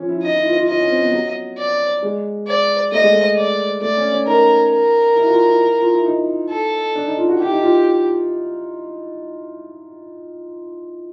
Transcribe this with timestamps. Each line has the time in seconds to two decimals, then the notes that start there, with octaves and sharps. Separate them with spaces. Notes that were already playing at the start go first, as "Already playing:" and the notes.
Already playing: F3 C#4
0.09 E4
0.23 D#4 D#5
0.35 E4
0.46 F4
0.57 F4
0.68 F4 D#5
0.79 C#4
0.90 C4
1.01 B3
1.13 F#3
1.58 D5
2.02 G#3
2.47 D5
2.92 A3 D#5
3.02 G#3
3.12 A3
3.37 D5
3.81 A3 D5
3.97 C#4
4.11 C#4
4.26 D#4 A#4
4.71 A#4
5.16 E4
5.26 F#4
5.30 F4
5.46 E4
5.80 F4
5.93 E4
6.06 D#4
6.50 A4
6.95 D4
7.06 D#4
7.17 F4
7.29 F#4
7.40 E4 G4
7.51 D#4
7.62 F4